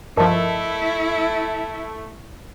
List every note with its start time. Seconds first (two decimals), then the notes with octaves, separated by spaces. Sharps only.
0.17 G2 F3 A3 E4 A#4 D#5 A5